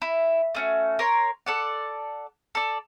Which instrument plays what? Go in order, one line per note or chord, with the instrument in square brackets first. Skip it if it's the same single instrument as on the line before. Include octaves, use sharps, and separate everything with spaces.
[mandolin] E4
A3 C#4 F#4
A#4 C#5 C6
A4 D5 F#5
A4 D5